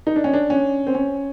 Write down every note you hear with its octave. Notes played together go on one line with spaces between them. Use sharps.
D#4
D4
C#4
D4
C#4
C4
C#4